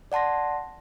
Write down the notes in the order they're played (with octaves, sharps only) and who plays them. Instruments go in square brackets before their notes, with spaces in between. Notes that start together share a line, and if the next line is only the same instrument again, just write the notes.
[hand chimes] D5 F#5 A5 C6 A#6